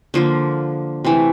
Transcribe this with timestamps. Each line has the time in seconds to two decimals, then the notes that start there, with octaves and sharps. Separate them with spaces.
0.14 D3 F3 A#3
1.05 C3 E3 A3